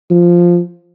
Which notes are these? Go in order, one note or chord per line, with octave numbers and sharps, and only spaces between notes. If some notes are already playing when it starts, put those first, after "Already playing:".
F3